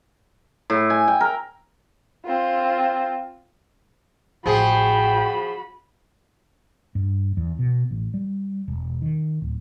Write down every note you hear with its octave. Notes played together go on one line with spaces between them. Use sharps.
A2
G#5
G5
A#4
C4 F4
A1 F3 F#4 G#4 G5 B5
G2
E2
B2
A1
G3
E1
D#3
D1